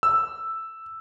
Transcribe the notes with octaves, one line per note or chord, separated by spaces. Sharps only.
E6